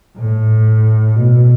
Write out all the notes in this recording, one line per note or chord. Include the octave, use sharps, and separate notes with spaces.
A2
B2